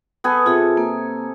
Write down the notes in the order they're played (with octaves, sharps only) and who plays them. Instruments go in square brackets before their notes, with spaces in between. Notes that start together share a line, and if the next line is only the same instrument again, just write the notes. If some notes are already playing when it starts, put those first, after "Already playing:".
[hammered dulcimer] B3 A4 G#5
[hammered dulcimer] C3 [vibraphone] F4 G#4
[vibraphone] A#3